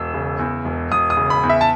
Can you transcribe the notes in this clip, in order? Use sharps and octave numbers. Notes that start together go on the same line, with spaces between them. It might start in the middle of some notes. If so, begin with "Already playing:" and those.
Already playing: E1 E6
C#3
E2
E1
E1 D#6
D#6
C#3
B5
E2
E5
A5